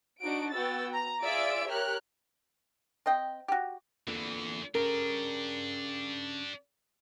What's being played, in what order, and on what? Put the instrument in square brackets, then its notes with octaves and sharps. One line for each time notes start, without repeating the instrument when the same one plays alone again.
[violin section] D4 D#4 F#4 D7
B3 F#4 G5 E6 A6
A#5
F4 G#4 D5 E5 E6 D7
G4 A#4 C#5 F6 F#6
[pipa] C4 D#5 G5
F#4 G4
[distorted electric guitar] E2 E3 [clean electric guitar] A#2 D3
[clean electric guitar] C#3 [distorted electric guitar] D4 G4 [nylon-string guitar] A#4